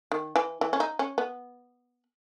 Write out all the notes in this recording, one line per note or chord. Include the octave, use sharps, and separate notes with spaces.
D#3
E3
E3
C#4
D#4
C#4
B3